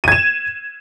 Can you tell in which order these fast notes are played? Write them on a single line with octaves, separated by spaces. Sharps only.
D#7 G#6 E7